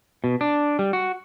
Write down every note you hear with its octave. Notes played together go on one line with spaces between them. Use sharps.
B2
D4
G3
F#4